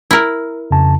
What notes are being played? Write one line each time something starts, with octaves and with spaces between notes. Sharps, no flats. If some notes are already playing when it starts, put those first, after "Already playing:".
E4 A#4
F2 C#3 A5